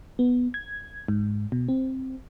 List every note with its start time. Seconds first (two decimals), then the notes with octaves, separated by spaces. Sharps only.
0.19 B3
0.54 G#6
1.08 G#2
1.52 B2
1.68 C4